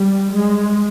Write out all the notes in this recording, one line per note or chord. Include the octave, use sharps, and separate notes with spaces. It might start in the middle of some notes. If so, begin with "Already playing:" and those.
Already playing: G3
G#3